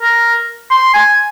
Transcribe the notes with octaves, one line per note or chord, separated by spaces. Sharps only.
A#4
C6
G#5